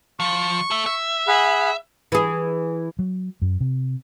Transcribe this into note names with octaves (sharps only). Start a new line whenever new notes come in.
F3 C#6
A4 E5
E5
G#4 F#5 B5
E3 G#4
F#3
F#2
C3